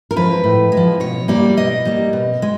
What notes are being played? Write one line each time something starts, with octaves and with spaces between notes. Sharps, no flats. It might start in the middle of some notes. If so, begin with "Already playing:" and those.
A#4
F3 G#3 B4
A2
G#3
F3
B2 C#5
G3 A#3 D5
B2 D#5
G3 A#3
B2
G#3